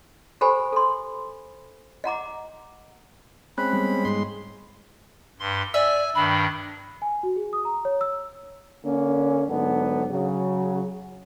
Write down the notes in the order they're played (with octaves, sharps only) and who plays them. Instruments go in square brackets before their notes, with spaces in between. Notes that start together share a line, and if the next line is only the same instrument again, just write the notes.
[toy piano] G4 A4 C5 G#5 B5
A4 C6
D#5 F#5 A#5 D6
[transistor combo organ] G#3 C4 C#4 [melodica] B5 [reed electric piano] F#6
[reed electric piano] G3 B3
[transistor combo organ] G#2 G#3 C6
[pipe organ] G2 C6
[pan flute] D5 [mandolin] E5 [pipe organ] G#5
[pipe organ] G2 D#3 D4 [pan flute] B5
[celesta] G#5
F#4
G#4
D#6
A#5
C#5
E6
[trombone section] D3 A#3 C#4
G#2 D3 F#3 B3
C#3 F#3